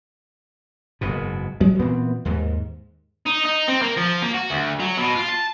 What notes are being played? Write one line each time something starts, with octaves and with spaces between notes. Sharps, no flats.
F#1 G#2 B2
F#3 G#3
A#2 E3 B3 C4
D#2 G#2
D#4
D#4
C4
A#3
F3
A#3
F#4
D2
F#3
B2
F4
A5